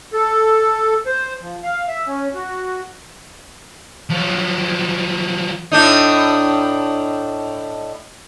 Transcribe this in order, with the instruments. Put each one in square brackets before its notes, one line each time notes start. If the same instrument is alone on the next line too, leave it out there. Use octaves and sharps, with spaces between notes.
[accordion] A4
C5
F3
F5
E5
C#4
F#4
[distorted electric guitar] F3 F#3
[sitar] A2 D4 D#4